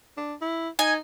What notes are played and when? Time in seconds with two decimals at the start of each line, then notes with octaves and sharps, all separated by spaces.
0.17 D4
0.41 E4
0.79 D#4 G#5